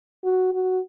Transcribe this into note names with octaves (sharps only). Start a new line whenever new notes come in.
F#4
F#4